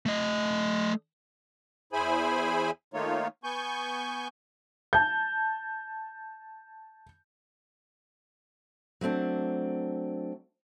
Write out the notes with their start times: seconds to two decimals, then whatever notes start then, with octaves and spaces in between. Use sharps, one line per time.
0.06 A3 D#5
1.93 E2 E4 G#4 C5 G#5 B5
2.94 D#3 A3 A#3 D#4 F4 C#5
3.44 B3 G#5 C#6 G6
4.93 A5 G6
9.01 F#3 A3 C4 D4